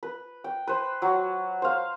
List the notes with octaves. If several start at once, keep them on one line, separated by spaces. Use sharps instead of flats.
B4
G5
B4 C5
F#3
C5 F5